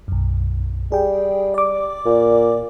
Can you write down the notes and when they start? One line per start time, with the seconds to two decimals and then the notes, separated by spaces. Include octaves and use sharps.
0.08 B1 F#2
0.92 G3 G#4 G5
1.54 D5 D6
2.06 A#2